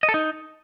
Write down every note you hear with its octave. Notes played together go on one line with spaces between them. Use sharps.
D#5
A4
D#4